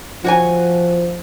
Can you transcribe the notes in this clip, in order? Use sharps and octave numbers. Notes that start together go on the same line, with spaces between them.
F3 F#4 C#5 G#5